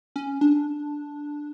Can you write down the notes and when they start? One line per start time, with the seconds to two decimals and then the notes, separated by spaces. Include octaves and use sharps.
0.16 C#4
0.41 D4